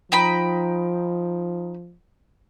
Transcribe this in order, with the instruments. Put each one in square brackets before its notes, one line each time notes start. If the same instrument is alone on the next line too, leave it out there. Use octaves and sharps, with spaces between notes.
[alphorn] F3 [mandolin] D#4 G5 B5